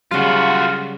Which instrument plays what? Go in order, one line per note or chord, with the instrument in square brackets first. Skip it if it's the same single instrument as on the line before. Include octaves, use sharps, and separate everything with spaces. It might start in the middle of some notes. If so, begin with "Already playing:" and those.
[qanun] C#3 F#3 G3 [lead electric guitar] F4 F#4